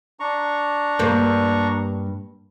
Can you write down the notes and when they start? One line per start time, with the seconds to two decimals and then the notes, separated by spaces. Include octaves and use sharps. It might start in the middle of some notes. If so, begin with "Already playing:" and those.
0.20 D4 A#5 C#6
0.99 G2 A#3